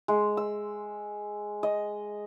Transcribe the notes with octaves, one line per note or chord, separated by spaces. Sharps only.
G#3
E6
D#5